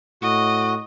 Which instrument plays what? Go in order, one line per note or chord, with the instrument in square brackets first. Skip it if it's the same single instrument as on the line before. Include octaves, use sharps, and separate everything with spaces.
[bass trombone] A2 [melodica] F#4 [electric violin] D#5